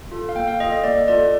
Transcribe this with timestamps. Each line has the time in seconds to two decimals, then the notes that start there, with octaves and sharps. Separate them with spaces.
0.12 F4 A4
0.29 F5
0.36 A#3 G5
0.48 F5
0.60 F4 A4 D#5
0.72 D#5
0.84 A#3 D5
1.08 F4 A4 D5